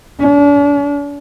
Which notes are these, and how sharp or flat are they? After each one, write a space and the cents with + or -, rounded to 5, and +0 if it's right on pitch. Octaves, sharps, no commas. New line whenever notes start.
D4 -40